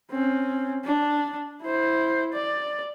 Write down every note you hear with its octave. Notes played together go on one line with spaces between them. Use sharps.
C4 C#4
D4
E4 C5
D5